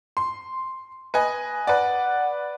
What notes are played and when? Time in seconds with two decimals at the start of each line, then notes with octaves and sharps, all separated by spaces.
0.17 C6
1.14 B4 D#5 G#5
1.67 B4 D5 F#5